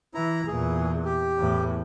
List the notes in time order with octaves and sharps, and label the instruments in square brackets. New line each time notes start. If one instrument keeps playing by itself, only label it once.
[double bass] E3 [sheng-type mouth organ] E4 A#5
[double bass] E2 A#2 [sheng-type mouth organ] G#4
[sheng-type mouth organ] G4
[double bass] E2 A2